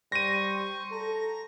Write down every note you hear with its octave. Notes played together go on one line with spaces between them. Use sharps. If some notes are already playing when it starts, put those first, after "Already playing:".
G3 C5 C#6 A#6 D#7
A4 A#5